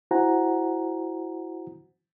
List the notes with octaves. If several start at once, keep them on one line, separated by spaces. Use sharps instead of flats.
E4 F#4 C5 F#5 G#5 A#5